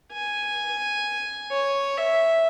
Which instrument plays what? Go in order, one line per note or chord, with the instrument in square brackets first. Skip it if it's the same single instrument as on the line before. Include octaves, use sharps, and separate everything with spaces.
[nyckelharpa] G#5
C#5
E5